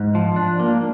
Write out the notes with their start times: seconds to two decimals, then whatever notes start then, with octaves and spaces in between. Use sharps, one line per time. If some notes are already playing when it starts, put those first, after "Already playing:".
Already playing: G#2
0.15 F3
0.36 D4
0.59 A#3